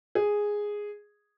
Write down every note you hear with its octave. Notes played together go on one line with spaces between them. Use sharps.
G#4